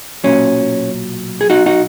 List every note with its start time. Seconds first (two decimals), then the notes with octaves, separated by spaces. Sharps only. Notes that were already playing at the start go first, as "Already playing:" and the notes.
0.24 B1 A#2 F#3 C#4
1.41 G#4
1.50 D#4 F#4
1.66 D#4 F#4